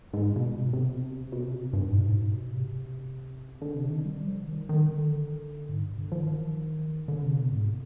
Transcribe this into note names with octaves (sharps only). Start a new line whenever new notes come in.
G#2
B2
C3
B2
C3
B2
C3
G2
G#2
B2
G#2
B2
C3
D3
C3
D#3
G3
F3
D#3
D#3
D3
G#2
G2
C3
D3
F3
D#3
D3
C3
B2
G#2